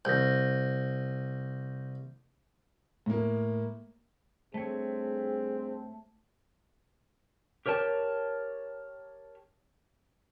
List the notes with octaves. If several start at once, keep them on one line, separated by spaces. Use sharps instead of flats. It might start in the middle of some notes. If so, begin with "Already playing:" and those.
C2 G6 A#6
A2 A#3
G2 A3 C4 G#4 C#5
G4 A#4 C#5 G5 A5